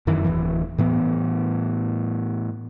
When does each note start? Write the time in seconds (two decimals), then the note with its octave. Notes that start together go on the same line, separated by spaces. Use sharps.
0.07 F#2 D#3 E3
0.25 D1 E3
0.78 A2 E3 B3